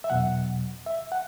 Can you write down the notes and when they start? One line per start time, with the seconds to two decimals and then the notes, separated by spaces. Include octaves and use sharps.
0.04 E5
0.10 E2 B2 F#3 F#5
0.86 E5
1.12 F#5